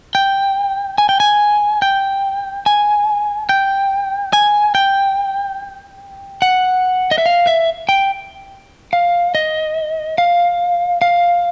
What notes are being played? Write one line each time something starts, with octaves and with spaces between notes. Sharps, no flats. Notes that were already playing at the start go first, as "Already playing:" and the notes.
G5
G#5
G5
G#5
G5
G#5
G5
G#5
G5
F#5
D#5
E5
F5
E5
G5
F5
D#5
F5
F5